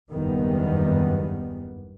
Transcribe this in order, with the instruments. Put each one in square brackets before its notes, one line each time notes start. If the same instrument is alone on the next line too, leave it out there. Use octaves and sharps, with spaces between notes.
[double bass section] F#1 E2 G2 D#3 G3 B3